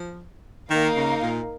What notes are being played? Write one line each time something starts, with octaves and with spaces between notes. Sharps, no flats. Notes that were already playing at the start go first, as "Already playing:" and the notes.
Already playing: F3
D#3 A#3 D#4 A#4 F5
C#3
A#2